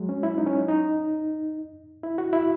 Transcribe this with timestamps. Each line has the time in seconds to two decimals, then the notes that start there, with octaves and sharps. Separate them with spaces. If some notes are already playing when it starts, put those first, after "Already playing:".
Already playing: F#3 G#3
0.09 C#4
0.23 E4
0.38 D#4
0.47 C#4
0.68 D#4
2.03 E4
2.18 F#4
2.33 E4